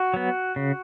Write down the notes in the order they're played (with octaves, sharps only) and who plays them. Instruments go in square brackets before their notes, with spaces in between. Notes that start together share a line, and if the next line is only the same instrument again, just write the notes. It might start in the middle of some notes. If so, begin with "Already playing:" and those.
Already playing: [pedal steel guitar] F#4
F#3 B3
C#3